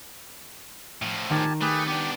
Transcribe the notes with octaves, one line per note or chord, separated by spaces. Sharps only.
A2 F3
D#3 G4 G#5 A5
A3 G4 G#4 B4
B3 D4 G4